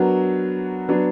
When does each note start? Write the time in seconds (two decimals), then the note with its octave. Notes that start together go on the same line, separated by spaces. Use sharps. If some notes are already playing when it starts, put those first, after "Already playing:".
Already playing: F#3 B3 D4 F#4 A#4
0.89 F#3 B3 D4